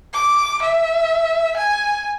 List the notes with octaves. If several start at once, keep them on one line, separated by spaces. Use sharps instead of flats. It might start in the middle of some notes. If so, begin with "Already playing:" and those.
D6
E5
G#5